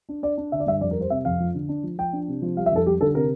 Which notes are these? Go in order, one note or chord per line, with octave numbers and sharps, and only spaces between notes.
D4
D4 D5
D4
D3 E5
D5
G2 E5
F2 D5
A#4
G3 C5
C3 E5
F2 F5
F3
D3
D4
F3
F3 G5
D4
C3
F3
G3 F5
E5
F2 A4
G3 G4
D3 A4
C3 A#4